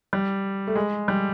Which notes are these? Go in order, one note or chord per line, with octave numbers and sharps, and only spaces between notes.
G3
A3
G#3
G3